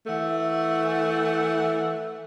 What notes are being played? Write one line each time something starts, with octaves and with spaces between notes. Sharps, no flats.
E3 A3 E5 F#5